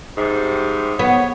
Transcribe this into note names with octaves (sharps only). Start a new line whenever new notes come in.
G#2 C3 G3
B3 C#5